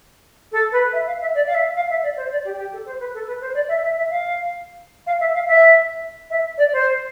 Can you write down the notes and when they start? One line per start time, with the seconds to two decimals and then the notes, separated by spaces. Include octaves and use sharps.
0.52 A4
0.72 B4
0.93 E5
1.06 F5
1.21 E5
1.35 D5
1.47 F5
1.54 E5
1.75 F5
1.90 E5
2.03 D5
2.17 C5
2.31 D5
2.44 G4
2.57 G4
2.72 A4
2.86 C5
2.99 B4
3.14 A4
3.27 B4
3.41 C5
3.54 D5
3.68 E5
3.83 E5
3.97 E5
4.10 F5
5.06 F5
5.20 E5
5.34 F5
5.47 E5
6.30 E5
6.58 D5
6.72 C5